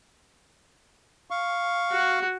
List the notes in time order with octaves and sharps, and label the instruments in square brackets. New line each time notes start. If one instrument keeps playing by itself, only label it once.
[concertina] F5 C#6
[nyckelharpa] F#4